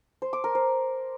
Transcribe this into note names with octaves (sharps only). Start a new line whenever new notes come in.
C5
D6
A#4
C5